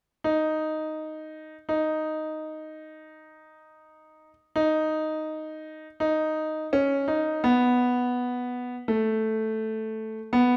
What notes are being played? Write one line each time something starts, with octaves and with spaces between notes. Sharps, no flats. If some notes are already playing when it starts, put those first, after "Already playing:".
D#4
D#4
D#4
D#4
C#4
D#4
B3
A3
B3